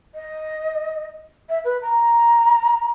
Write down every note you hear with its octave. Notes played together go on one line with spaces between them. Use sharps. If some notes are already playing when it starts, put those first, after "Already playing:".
D#5
E5
B4
A#5